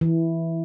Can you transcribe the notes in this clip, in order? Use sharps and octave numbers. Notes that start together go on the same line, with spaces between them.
E3